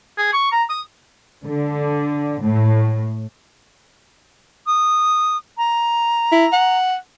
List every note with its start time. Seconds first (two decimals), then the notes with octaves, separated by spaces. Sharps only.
0.17 G#4
0.33 C#6
0.52 A#5
0.69 D#6
1.45 D3
2.42 A2
4.67 D#6
5.58 A#5
6.32 E4
6.52 F#5